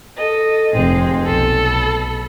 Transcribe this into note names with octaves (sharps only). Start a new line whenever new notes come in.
A4 D#5
F1 G#3 C4
B1 A4
B5